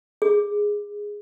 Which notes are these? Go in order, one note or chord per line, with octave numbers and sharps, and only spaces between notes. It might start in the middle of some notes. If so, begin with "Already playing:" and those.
G#4